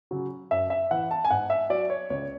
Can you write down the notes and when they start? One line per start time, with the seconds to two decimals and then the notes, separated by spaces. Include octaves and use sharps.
0.11 C#3 F#3
0.51 F#2 E5
0.70 E5
0.91 E3 F#5
1.11 A5
1.25 G#5
1.30 G#2 F#5
1.50 E5
1.70 F#3 D5
1.90 C#5
2.10 C#2 C#5